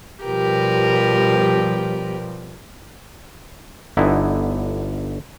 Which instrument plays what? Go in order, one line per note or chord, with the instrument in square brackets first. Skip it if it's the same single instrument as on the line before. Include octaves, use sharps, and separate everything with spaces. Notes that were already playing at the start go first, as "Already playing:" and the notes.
[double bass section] B2 F3 G3 [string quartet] G4 A#4 B4
[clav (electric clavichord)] G1 D3 B3 D#4 E4 G#5